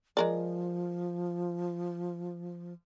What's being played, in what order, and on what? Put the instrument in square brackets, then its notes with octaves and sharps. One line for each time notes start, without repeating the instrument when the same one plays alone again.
[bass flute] F3 [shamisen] G#3 A#4 D5